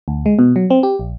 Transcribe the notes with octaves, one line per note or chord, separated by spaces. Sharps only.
D2
G#3
B2
F#3
C4
G4
A#1